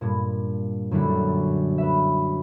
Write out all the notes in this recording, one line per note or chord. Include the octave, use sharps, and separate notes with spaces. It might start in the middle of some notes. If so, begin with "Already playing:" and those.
G2 A#2
F#2 D3 G3 E4 F#4
B4 E5